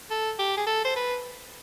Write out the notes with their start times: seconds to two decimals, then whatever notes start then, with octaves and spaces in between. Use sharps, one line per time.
0.11 A4
0.39 G4
0.57 G#4
0.67 A4
0.85 C5
0.96 B4